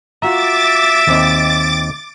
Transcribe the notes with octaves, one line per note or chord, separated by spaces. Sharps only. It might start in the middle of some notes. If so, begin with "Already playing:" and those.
F4 F#4 E5 A#5 D6 A6
D#2 C4 D#5